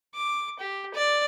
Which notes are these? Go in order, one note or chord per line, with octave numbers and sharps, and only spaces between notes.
D6
G4
D5